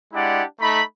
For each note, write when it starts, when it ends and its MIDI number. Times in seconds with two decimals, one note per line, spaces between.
0.13 0.42 56
0.13 0.42 62
0.13 0.42 64
0.13 0.42 67
0.13 0.42 74
0.13 0.42 78
0.60 0.82 57
0.60 0.82 63
0.60 0.82 82
0.60 0.82 83